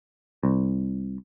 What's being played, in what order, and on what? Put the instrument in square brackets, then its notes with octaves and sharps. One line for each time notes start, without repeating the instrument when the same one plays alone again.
[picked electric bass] C2